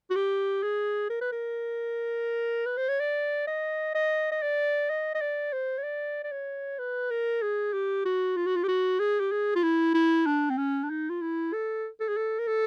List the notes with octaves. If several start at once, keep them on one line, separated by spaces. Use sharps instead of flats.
F#4
G4
G#4
A#4
B4
A#4
B4
C5
C#5
D5
D#5
D#5
D#5
D5
D#5
D#5
D5
C5
C#5
D5
D5
C#5
B4
A#4
G#4
G4
F#4
F4
F#4
F4
G4
F#4
G#4
G4
G#4
F4
E4
E4
D4
C4
C#4
D4
D#4
F4
E4
A4
A4
G#4
A4
A#4
A4